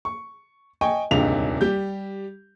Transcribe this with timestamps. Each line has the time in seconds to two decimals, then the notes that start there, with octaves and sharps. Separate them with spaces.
0.05 C#6
0.81 D#5 G5 G#5 C#6
1.11 D#1 C#2 G2 C3 D#4 F7
1.61 G3 G4 G6